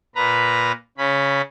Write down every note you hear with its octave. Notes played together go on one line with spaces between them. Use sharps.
A#2 B4 A#5 B5
C#3 C#4 B5